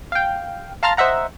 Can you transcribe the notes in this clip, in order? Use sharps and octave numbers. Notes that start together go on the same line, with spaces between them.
F5 G5
F5 A5 A#5 C6 F6 A6
C5 D#5 E5 F#5 A#5